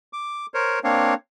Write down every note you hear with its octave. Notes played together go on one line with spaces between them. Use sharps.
D6
A#4 C5 C#5
A#3 C4 D4 C#5 F5